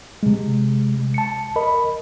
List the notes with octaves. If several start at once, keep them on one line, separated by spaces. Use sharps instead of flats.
C3 G#3
A5 C#7
A#4 D#5 B5